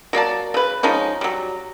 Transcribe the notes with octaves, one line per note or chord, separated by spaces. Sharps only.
F#3 A#3 D5 A5
C#3 B4
F3 G#3 C#4 D#4
F#3 G3